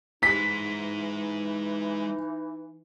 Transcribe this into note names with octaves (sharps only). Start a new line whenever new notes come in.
E3 G#3 D#4 C5 B6